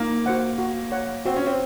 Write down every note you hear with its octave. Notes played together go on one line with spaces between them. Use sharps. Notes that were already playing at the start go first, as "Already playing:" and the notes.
Already playing: A#3 D#4
F#4 C5 F#5
F#4
C#5 F#5
C4 F#4
C#4
C4